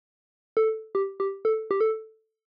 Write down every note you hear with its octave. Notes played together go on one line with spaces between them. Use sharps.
A4
G4
G4
A4
G4
A4